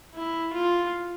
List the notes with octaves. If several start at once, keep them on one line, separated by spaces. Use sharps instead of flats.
E4
F4